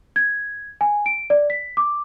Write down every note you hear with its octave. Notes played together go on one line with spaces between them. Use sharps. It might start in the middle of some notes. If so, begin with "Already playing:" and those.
G#6
G#5
D7
D5
B6
D6